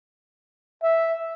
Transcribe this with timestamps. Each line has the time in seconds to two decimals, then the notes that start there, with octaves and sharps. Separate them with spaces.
0.83 E5